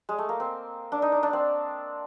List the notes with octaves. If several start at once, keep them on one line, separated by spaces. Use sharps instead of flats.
G#3
A3
A#3
C4
D4
D#4
D4
D4
C4